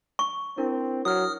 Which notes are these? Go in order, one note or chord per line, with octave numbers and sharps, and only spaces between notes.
C#6
C4 D4 E4 A#4
F#3 D#6 F6